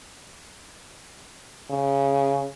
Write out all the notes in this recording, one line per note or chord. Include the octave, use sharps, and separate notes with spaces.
C#3